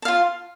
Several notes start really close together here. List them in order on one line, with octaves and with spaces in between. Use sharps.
A5 F5 F4